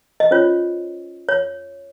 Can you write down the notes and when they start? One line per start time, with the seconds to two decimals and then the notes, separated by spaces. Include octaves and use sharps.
0.20 D#5
0.31 C#4 F4 C5 C#5
1.29 C#5